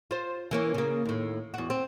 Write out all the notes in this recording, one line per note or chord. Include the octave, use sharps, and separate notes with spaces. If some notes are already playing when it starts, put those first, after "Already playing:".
F4 C5
E3 A#3 C#4
C#3 A#3
D#2 A2
E2 F#4
C4